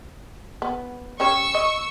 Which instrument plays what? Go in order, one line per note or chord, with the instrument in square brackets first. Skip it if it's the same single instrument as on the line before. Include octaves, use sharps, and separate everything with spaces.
[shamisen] B3
[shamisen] C#4 G4 C#5 [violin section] C#6 E6
[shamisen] D#5